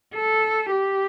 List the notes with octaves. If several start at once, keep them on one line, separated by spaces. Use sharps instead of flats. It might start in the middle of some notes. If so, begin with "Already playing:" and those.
A4
G4